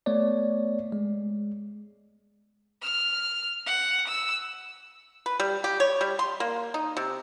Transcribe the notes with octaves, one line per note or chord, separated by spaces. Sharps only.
A3 B3 C#5 D5
G#3
F6
F#5
E6
B4
G3
G4
C#5
G3
C6
A#3
D#4
C3